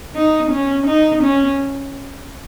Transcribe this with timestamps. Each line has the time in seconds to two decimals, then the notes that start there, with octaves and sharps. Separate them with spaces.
0.15 D#4
0.51 C#4
0.87 D#4
1.23 C#4